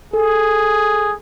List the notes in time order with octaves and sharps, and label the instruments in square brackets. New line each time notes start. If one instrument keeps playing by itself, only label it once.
[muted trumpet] G#4 [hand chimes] A4